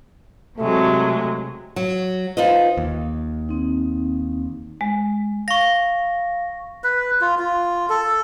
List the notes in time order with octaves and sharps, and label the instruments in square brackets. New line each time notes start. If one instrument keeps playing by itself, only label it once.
[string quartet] C3 F#3 G#3 [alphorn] A3
[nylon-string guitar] F#3
D#4 F4 B4 C5 D#5
[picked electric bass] D#2
[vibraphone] C4 D#4
[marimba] G#3
[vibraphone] F5 [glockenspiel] C#6 A#6
[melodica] B4
F4
F4
A4